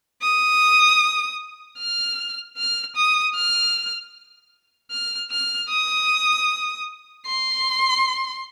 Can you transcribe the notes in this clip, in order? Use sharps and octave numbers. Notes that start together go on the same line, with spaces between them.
D#6
F6
F6
D#6
F6
F6
F6
D#6
C6